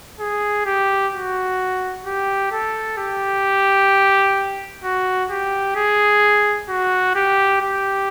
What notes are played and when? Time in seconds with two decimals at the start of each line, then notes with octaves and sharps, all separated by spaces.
0.20 G#4
0.66 G4
1.13 F#4
2.06 G4
2.51 A4
2.98 G4
4.84 F#4
5.30 G4
5.76 G#4
6.69 F#4
7.15 G4
7.61 G4